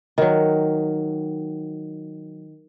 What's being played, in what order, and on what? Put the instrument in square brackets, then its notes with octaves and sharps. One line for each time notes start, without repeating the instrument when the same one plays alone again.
[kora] D#3 F#3